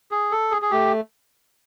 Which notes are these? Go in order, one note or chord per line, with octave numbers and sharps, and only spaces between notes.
G#4
A4
G#4
G#4
A3 G4